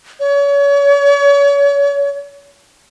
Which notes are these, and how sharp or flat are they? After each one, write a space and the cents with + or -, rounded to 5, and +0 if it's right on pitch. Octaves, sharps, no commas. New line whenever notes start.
C#5 +35